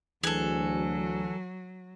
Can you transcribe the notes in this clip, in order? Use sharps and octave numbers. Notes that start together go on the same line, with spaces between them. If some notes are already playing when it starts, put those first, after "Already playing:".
D2 E3 F#3 G#4 A4 F#6